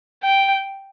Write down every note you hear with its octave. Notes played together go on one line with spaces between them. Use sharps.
G5